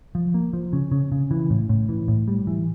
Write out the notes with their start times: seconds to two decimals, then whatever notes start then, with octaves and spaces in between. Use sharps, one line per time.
0.15 F3
0.34 A#3
0.53 F3
0.73 C#3
0.92 C#3
1.12 C#3
1.31 E3
1.50 A2
1.69 A2
1.89 E3
2.08 A2
2.28 G3
2.47 E3